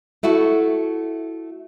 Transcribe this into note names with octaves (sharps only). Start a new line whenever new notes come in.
A3 E4 F#4 A4